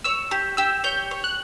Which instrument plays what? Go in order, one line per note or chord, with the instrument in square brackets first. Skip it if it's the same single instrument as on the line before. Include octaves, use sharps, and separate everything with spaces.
[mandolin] C#5 [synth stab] E6
[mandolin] G4
[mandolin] G4 [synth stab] E6
[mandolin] C#5 [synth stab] G6
[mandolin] C#5
[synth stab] F#6